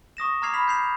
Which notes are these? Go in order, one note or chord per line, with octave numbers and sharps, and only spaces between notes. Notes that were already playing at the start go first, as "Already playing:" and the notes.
C#6 D#6 A#6 E7
A#5 D6 F6 G#6 C7 F7
B5 B6 F7
G6 C7 F7